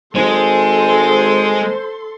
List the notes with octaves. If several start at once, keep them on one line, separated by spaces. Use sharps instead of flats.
G#1 G#3 G#4 A4 C5 C6